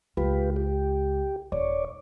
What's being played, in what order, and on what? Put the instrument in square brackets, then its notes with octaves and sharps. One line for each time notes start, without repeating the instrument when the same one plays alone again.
[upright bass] C#2 [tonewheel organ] F4 G4 B4
[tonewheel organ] G4
[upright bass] D#1 [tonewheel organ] C#5 D5